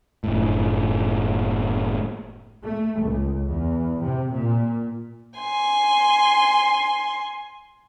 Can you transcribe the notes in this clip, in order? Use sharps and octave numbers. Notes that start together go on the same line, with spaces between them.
F#1 A2
A3
C#2
E2
C3
A#2
G#5 C6